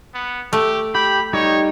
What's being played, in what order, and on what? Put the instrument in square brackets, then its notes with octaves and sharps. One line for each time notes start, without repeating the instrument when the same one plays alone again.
[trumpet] B3
[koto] A3 [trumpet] G4
[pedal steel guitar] G4 [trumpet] B5
[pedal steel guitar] G3 D#4 G4 [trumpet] C#5